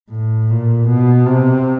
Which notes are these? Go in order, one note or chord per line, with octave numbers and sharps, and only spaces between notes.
A2
A#2
B2
C3